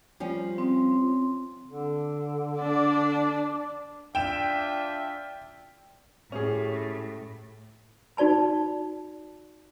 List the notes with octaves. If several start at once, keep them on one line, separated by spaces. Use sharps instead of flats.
F3 G3 C#4
C4
D3
D4 D5
D4 F4 E5 G5 E7
A2 C#4 G4 G#4
D#4 F#4 D5 A5 B5